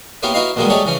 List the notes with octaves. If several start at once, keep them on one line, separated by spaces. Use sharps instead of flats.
A#3 B3 C#4 E4 G4
D#4 E4 F#4 B4 D#5 F5
D#2 B2 D#3 G3 G#3 B3
G3 A3 D#4 G#4 A4 C#5
C#3 E3 C#4